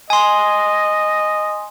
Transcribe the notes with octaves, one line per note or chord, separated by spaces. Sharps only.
D#5 G#5 C6